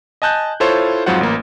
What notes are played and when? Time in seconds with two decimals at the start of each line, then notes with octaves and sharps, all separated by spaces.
0.22 D#5 G#5 A5 F#6 G6
0.60 E4 F4 A4 C5 C#5
1.06 F2 G#2 F#3 F4 C5 F#5
1.21 A1 A#3